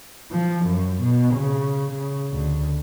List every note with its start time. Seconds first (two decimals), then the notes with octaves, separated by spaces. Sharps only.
0.31 F3
0.65 F#2
1.02 B2
1.33 C#3
1.91 C#3
2.32 D2